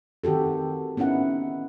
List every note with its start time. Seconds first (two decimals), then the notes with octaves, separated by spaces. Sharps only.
0.24 D#3 C4 F#4 G4 A4
0.97 B3 C#4 D#4 E4 F#5